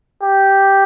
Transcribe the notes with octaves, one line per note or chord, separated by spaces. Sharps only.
G4